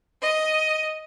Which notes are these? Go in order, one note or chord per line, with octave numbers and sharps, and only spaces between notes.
D#5